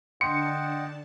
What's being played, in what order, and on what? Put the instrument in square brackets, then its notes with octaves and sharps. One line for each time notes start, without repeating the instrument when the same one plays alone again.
[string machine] D3 D4 A5 [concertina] D#5 F#5 G5 [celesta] C6 [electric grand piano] C#7